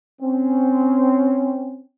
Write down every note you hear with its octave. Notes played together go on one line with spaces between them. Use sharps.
C4 C#4